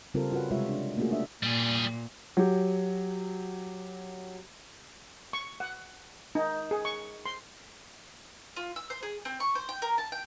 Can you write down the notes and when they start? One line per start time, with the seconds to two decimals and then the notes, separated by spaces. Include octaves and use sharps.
0.14 C#3 G3 C4 F4 A4 A#4
0.31 C#4 F4 F#4 B4 F#5
0.51 C3 G3 G#3 F4 C#5 E5
0.69 D4
0.97 A3 A#3 C#4 F4 F#4 G#4
1.11 D4 E5
1.43 A#2 G3 G#4
2.37 F#3 G4
5.33 C#6
5.60 F#5
6.35 D#4
6.71 G#4
6.85 C#6
7.26 C6
8.56 F4
8.76 E6
8.90 C5
9.03 G#4
9.25 C4
9.40 C#6
9.55 C5
9.69 G5
9.82 A#4
9.98 A5
10.12 G5